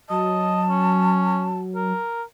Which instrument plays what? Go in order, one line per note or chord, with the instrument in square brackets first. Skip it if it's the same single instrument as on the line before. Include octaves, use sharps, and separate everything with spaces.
[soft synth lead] F#3 [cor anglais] D#5 [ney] A5
[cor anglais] C#4
A#4